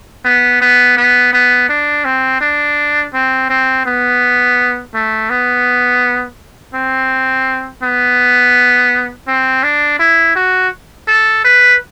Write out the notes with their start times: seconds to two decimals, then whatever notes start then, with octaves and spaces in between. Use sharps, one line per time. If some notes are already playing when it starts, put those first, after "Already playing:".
0.25 B3
0.61 B3
0.97 B3
1.33 B3
1.69 D4
2.05 C4
2.41 D4
3.14 C4
3.50 C4
3.86 B3
4.94 A3
5.30 B3
6.75 C4
7.83 B3
9.28 C4
9.63 D4
9.99 E4
10.36 F#4
11.08 A4
11.44 B4